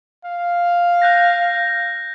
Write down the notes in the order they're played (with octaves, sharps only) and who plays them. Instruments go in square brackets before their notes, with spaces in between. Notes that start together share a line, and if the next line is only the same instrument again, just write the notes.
[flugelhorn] F5
[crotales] F#6 G6 A#6